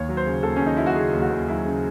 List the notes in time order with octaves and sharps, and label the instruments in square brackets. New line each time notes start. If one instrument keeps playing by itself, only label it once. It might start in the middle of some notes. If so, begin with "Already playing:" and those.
Already playing: [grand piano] D#2 C#5
F#3
C5
C#3
D#2 A4
D#2 C#4
D#4
F#3 E4
F#4
C#3 G#4
D#2
F#4
D#2
F#3 E4
C#3